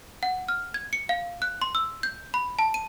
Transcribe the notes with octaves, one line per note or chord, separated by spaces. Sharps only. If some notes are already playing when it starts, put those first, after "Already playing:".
F#5
F6
G#6
C#7
F5
F#6
C6
E6
G6
B5
A5
D#7